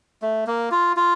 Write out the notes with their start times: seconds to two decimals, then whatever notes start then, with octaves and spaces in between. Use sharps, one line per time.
0.22 A3
0.47 A#3
0.72 F4
0.97 F4